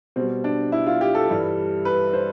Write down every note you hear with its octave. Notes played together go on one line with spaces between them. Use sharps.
B2 G3 C4
D4
E4
F4
G4
A4
G2 E3 G3
B4
C5